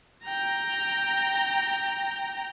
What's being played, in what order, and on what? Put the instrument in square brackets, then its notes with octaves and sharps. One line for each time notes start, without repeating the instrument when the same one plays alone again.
[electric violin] G5 A#5